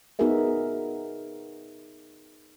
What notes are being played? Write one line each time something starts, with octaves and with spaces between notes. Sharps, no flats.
B3 D#4 F#4 G#4 A#4 E5